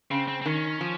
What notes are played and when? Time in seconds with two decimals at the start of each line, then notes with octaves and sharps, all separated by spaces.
0.11 C#3 C4
0.28 C4
0.42 C4
0.46 D#3 C#4
0.81 F3